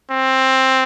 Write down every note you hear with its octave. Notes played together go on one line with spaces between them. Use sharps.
C4